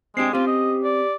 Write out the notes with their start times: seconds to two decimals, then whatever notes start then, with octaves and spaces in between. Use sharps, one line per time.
0.17 G#3 C4 D4 G4 C7
0.33 C4 C#4 F4 G4
0.47 D#5
0.83 D5